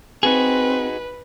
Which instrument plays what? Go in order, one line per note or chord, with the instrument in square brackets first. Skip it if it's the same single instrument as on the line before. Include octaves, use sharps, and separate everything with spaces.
[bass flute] C4 [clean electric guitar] D#4 F#4 G#4 [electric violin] B4